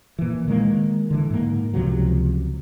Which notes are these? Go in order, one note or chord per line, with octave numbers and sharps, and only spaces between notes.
A#2 E3
D#3 G#3 A#3
D3 E3
G#2 A#3
C#2 C3 F3 F#3